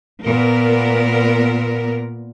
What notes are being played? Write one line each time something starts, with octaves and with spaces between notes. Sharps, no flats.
A#2 B3 A#4